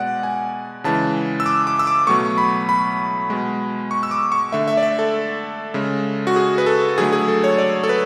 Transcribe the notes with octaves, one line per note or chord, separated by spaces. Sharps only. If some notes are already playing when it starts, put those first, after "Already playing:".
Already playing: B2 G#3 D5 F#5
G#5
C#3 E3 G#3 A5
E6
D6
D6
E6
D6
B2 F#3 A3 C#6
B5
B5
B2 G#3
C#6
E6
D6
C#6
D3 A3 E5
E5
D5
E5
A4
C#3 G#3
F#4
G#4
B4
A4
D3 F#3 A3 G#4
G#4
A4
C#5
D5
A4
B4